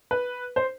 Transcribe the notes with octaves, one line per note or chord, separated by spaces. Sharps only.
B4
C5